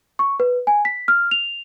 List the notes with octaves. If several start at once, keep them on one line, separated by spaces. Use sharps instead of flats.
C#6
B4
G#5
B6
F6
F7